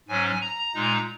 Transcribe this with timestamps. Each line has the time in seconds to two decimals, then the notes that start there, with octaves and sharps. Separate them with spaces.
0.08 G#2 F#3 C#4 G#5
0.41 A#5
0.74 A#2 G#3 D#4